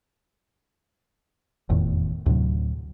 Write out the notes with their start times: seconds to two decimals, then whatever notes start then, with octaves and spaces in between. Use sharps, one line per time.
1.69 F1 E2 A2 D#3
2.26 D2 A2 C3 F#3